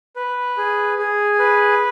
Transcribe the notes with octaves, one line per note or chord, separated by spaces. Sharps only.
B4
G#4
G#4
B4